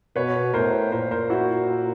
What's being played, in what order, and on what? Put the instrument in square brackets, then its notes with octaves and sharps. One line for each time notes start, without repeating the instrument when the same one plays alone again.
[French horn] B2 [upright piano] B4 C#5
[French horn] A2 [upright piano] A#4 C5
[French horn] A#2 [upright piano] A#4 C5
[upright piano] A#4 C5
E4 F#4